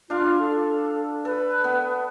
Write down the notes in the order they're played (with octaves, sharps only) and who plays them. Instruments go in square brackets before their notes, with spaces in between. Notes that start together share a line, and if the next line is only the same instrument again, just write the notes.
[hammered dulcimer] D4 F5 [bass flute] F4
[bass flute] A4
[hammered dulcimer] A4 [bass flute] B4
[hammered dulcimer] B3